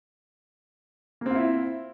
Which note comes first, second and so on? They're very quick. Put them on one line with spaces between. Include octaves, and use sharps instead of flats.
A#3 C4 F4 E4